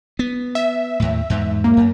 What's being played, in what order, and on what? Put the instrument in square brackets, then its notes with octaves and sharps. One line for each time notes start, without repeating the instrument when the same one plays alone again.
[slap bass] B3
[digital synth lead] E5
[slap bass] D#2 A2
E2 G#2
[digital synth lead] A#3
[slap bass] F#2